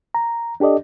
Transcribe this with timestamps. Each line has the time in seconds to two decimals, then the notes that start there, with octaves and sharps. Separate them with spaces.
0.15 A#5
0.60 D4 G4 A4 D5 D#5